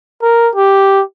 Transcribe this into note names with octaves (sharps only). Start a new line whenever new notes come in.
A#4
G4